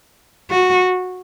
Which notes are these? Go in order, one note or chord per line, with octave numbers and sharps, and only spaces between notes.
F#4